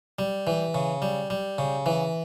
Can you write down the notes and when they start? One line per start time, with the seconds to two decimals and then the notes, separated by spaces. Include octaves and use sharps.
0.19 G3
0.47 E3
0.75 C#3
1.02 G3
1.30 G3
1.58 C#3
1.86 E3